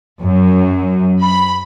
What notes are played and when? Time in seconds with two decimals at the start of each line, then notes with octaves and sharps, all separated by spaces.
0.21 F#2
1.21 B5